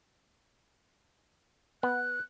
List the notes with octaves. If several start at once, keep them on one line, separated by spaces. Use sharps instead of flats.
B3 F#6